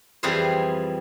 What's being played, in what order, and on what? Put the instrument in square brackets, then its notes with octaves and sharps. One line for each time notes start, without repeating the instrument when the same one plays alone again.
[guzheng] F2 E3 G3 G#4 B4 C5